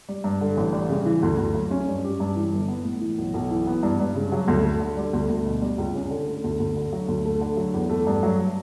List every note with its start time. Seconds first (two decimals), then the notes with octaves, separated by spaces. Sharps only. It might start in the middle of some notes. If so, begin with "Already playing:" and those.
0.09 G3
0.24 G2
0.41 D3
0.57 A1
0.73 G3
0.89 C#3
1.05 E3
1.23 D2
1.38 D2
1.54 F#3
1.71 C#4
1.88 G2
2.04 G4
2.20 G2
2.36 E3
2.53 G1
2.68 B3
2.85 A2
3.01 E3
3.18 B1
3.34 B1
3.51 E3
3.67 B3
3.83 G2
4.00 G2
4.15 C#3
4.32 F#3
4.48 D2
4.64 A3
4.80 D3
4.97 G3
5.13 D2
5.29 D2
5.46 B2
5.62 G3
5.78 C#2
5.95 C#4
6.10 D3
6.27 A3
6.44 D2
6.60 D2
6.76 D3
6.93 F#3
7.08 D2
7.25 A3
7.41 D3
7.57 F#3
7.74 E2
7.90 A3
8.07 G2
8.23 F#3